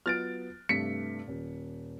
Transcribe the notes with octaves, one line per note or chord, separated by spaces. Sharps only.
F#3 B3 F4 F6 A6 D7
G2 C3 A3 B6 C#7
D#1